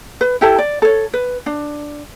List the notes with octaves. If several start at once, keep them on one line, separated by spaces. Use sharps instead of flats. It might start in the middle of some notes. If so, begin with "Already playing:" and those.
B4
E4 G4 A4 A5
D5
A4 C#5
B4
D4